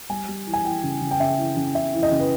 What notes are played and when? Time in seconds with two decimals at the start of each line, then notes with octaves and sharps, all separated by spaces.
0.10 G3 G#5
0.28 G3
0.47 E3
0.53 G#5
0.65 E3 G5
0.83 C#3
1.02 C#3
1.11 G5
1.20 C#3 E5
1.39 E3
1.57 C#3
1.75 C#3 E5
1.93 E3
2.03 D#5
2.11 C#3
2.19 B4